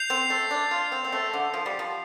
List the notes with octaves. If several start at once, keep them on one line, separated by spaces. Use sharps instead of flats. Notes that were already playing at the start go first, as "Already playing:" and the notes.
Already playing: G6 C7 F7
C4
A3
D4
F4
C4
C4
A3
D3
F3
G3
F3